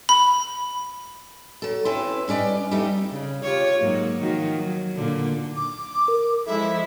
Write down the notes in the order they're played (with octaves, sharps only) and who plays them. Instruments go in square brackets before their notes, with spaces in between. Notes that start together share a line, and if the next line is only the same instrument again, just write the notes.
[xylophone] B5
[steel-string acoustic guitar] F#3 A4
C4 C#4 E4 B4
G3 C#4 B4 D5 D#5
F2 G3 A3 C4 D#4 E4
[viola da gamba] C#3
F4 G4 C#5
G#2 F#3 A#3
D#3 F3 F#4
F#3
A#2 D3
[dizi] D6
[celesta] A#4
[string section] F3 G#3 E4 [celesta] A4 [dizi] E5